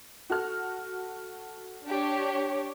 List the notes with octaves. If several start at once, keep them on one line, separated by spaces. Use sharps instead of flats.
F#4 A4 F6
D4 G4 C#5